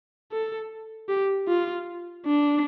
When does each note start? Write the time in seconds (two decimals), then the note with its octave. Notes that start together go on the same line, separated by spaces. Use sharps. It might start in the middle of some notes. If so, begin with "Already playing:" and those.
0.32 A4
1.09 G4
1.48 F4
2.26 D4